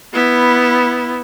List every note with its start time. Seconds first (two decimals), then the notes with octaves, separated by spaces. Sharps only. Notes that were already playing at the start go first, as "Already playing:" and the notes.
0.13 B3 E4